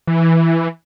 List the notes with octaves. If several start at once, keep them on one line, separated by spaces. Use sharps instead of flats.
E3